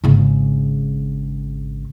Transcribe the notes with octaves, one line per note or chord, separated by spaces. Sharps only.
G#1 C#3